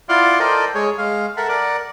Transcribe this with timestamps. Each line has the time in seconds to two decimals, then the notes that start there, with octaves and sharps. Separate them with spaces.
0.09 E4 F4 D5 F5 F#5 C6
0.40 A4 A#4 C5 D5 D#5 G5
0.75 G#3 G#4 C#5
0.98 G#3 F5
1.37 A4 A#4 E5 F#5
1.49 A#4 D5 F#5